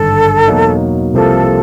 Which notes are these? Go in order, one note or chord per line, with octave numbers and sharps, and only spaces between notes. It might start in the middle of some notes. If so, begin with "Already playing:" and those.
Already playing: G#1 G2 D3 A4
E2 B2 F#3 A#3 D#4
C2 C3 F3 A#3 A4